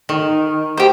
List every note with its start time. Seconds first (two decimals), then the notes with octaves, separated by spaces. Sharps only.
0.09 D#3
0.77 G4 C5